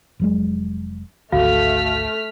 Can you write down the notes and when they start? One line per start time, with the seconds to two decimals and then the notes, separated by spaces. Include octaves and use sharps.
0.19 F1 F#3 G#3
1.32 G#1 D2 A3 F#4 F5 F6 B6